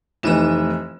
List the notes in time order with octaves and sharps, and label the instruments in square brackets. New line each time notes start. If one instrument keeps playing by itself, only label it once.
[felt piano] F1 E3 E7 [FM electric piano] A3 D#4 B4